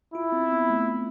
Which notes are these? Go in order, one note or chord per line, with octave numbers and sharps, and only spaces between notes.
E4 F4
C4
B3
A3